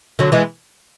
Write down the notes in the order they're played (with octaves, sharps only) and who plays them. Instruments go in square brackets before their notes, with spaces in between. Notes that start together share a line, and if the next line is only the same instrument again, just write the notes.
[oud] D3 F#3
E3 G#3